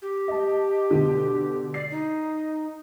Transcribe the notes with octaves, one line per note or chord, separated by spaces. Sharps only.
G4
D#5 A5
B2 D3
D5 C7
D#4